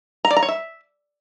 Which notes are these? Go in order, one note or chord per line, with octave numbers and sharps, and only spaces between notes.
A#5
D5
A#5
C#5
E5